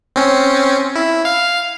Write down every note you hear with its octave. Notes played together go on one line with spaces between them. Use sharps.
C4 C#4
E4
F5